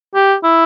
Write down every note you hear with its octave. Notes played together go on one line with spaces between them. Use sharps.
G4
E4